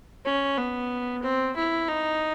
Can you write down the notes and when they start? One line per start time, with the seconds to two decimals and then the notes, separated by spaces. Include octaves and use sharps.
0.25 C#4
0.57 B3
1.22 C4
1.56 E4
1.88 D#4